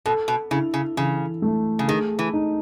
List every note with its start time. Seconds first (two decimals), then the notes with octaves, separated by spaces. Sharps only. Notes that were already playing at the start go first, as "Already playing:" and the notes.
0.06 B2 A4
0.28 B2
0.51 C#3 E4
0.74 C#3
0.97 C#3 E3
1.42 A3
1.79 C#3
1.88 D#3 G#4
2.19 E3
2.33 D#4